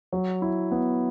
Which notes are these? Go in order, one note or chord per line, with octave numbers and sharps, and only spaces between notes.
F#3
E4
B3